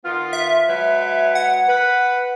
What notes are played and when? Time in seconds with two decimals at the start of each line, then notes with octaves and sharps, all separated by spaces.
0.04 D#3 B3 F4
0.33 E5
0.68 F#3 G#3 B4
1.35 F#5
1.68 B4